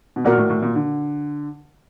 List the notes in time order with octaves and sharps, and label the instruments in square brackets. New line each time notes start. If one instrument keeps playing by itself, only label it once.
[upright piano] B2
[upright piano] A#2 [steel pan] F#4 A#4 D5 F#5
[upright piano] A2
A2
A#2
D3